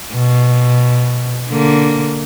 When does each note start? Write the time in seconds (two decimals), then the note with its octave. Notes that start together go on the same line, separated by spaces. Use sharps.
0.15 B2
1.50 D3 A#3